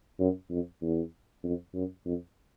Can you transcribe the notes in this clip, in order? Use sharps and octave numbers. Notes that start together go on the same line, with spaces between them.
F#2
F2
E2
F2
F#2
F2